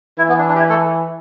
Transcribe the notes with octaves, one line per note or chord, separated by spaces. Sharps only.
E3 E4
B3
D4
D4
G4
E4
A3 A4